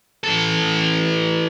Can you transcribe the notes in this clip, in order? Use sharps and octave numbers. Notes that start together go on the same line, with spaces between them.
E3 A4